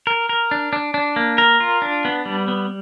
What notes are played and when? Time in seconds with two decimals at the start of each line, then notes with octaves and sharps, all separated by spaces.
0.07 A#4
0.29 A#4
0.51 D4
0.73 D4
0.94 D4
1.16 A#3
1.38 A#4
1.60 F4
1.82 D4
2.05 B3
2.26 G3
2.48 B3